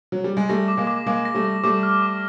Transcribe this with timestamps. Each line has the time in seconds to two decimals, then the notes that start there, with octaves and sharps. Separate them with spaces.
0.12 F#3
0.24 G3
0.37 G#3
0.49 G3 A3 A#6
0.68 D6
0.77 G#3 A#3
0.87 D6
1.06 G#3 A#3 D6
1.25 A#6
1.35 G3 A3
1.45 A#6
1.63 G3 A3 D6
1.83 F6
2.02 D6